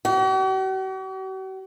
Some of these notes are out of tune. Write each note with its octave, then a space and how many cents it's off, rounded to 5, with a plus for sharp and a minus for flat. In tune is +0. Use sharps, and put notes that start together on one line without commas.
F#4 +45